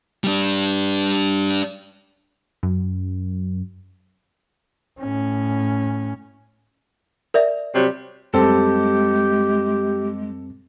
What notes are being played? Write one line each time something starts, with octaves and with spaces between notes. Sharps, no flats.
G3 D4
F#2
A2 C#4
A#4 D5 E5
C3 F#3 G3
F#2 G3 G#3 C4 G4 A4